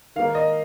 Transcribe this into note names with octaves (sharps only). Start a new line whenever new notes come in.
D#3 A#3 F5
D#5